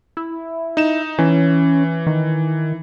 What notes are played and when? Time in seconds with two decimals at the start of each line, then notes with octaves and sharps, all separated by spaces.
0.17 E4
0.77 D#4 E7
1.19 E3 C#4
2.07 D#3